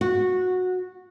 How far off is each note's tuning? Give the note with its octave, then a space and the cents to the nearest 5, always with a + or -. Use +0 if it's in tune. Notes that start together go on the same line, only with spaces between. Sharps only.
F#4 -15